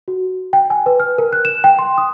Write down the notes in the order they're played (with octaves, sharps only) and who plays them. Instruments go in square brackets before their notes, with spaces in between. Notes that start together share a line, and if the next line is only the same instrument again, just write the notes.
[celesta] F#4
G5
G#5
B4
F6
A#4
F#6
E7
G5
C6
D#6